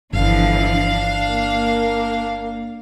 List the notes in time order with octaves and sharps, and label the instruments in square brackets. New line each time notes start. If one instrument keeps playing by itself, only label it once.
[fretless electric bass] G1 [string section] D3 E3 F3 [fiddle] D4 F5
[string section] A#3